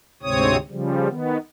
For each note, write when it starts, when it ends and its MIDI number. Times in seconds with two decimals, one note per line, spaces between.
0.23 0.57 38
0.23 0.57 44
0.23 0.57 48
0.23 0.57 60
0.23 0.57 73
0.23 0.57 87
0.70 1.08 49
0.70 1.08 53
0.70 1.08 55
1.09 1.37 51
1.09 1.37 59